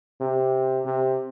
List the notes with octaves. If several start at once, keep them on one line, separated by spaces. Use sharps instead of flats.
C3
C3